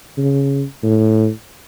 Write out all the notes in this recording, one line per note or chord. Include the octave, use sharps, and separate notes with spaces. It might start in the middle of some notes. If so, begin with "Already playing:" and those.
C#3
A2